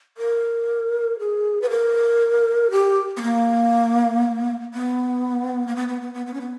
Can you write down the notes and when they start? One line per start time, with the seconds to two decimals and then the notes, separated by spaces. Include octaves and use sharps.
0.17 A#4
1.19 G#4
1.62 B4
1.70 A#4
2.71 G4
3.17 B3
3.22 A#3
4.74 B3
5.68 A#3
5.76 B3
5.88 B3
6.01 B3
6.14 B3
6.26 B3
6.34 C#4
6.41 B3